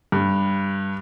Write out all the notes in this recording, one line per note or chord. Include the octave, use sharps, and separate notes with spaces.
G2